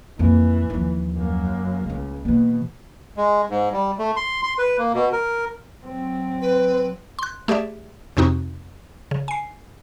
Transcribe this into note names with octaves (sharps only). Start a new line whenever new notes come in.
F2 E3 A#3
D#2 F3
F#2 A#3
C#2 A3 C#4
B2 E3 A#3
G#3
G#2
G3
A3
C6
C6
B4
A#3
B2
A#4
F#3 C4
B4
C6 F#6
A3 G4 G#4 D5 E5
F2 C3 C4 D#4 F#4
C#3
G#5 C7